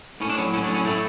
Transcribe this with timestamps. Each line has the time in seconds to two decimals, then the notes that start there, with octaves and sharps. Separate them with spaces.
0.21 A2 C#4
0.30 D4
0.37 F#3 C#4
0.53 A2 C#4
0.64 D4
0.69 F#3
0.75 C#4
0.85 A2 A3